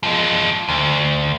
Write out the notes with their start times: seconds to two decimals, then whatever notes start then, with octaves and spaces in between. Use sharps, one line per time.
0.03 F3 G#3
0.68 D2